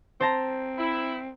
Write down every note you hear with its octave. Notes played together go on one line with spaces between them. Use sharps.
C4 C5 A5 A#5
E4